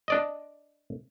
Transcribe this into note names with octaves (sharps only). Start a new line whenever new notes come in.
D4 D5 D#5